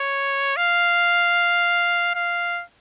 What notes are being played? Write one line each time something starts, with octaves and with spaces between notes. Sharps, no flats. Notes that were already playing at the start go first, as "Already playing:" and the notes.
Already playing: C#5
F5
F5